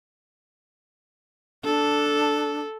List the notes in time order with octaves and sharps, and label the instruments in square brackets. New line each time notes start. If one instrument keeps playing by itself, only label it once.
[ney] D4 [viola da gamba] A4